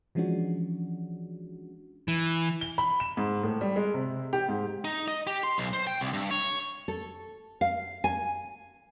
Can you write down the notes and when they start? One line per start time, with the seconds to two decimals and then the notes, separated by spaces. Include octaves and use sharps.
0.15 E3 F3 G#3 C#4 D4 F#4
2.08 E3
2.61 G7
2.78 B5
3.00 E7
3.17 G#2
3.43 A2
3.61 G3
3.76 G#3
3.94 C3
4.33 G4
4.49 G#2
4.85 D#4
5.08 D#5
5.27 G4
5.43 C6
5.58 B1
5.73 C5
5.87 G5
6.01 C2
6.13 G2
6.31 C#5
6.88 A4
7.61 F5
8.04 G#5